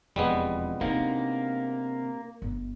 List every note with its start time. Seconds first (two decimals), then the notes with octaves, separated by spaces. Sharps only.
0.16 E1 F2 G3 G#3 B3
0.81 C3 A#3 D4 D#4
2.42 G1